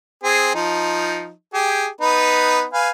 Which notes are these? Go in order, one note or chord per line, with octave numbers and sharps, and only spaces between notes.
C4 G#4
F3 D#4
G4 G#4
B3 D#4 B4
B4 F5 G#5